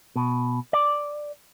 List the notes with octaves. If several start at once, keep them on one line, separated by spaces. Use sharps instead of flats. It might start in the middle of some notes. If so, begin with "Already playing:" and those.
B2
D5